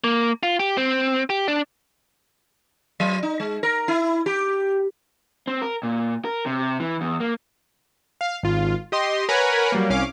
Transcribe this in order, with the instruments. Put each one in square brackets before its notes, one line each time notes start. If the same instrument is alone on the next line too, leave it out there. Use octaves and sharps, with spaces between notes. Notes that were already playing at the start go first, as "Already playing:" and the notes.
[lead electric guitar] A#3
F4
G4
C4
G4
D4
[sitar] F#3
D#4
G#3
A#4
E4
G4
[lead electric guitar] C4
A#4
A#2
A#4
C3
E3
E2
A#3
[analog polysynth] F5
G#1 F4
G4 D#5 C6
A#4 B4 C#5 F#5 G#5 B5
F#3 G3 A#3
C2 C#4 F5 D6